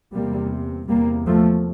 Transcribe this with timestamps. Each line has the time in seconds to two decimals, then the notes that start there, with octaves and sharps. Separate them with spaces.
0.13 E2 C3 G3 A#3
0.89 E2 C3 G3 A#3
1.27 F3 A3